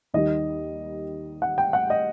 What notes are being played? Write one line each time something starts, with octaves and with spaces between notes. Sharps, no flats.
D#2 D#3 G3 D#5
F#5
G5
F#5
D#5